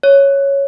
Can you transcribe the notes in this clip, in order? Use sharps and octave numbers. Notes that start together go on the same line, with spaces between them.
C#5